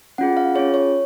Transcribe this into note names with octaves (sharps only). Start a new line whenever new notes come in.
C#4 F4 G#4 F#5
F5
C#4 F4 G#4 C#5
C#5